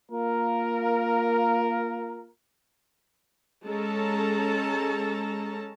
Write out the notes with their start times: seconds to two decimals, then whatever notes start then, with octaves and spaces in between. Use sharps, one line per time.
0.11 A#3 F4 A#4
3.64 G#3 C#4 A4 A5 A#5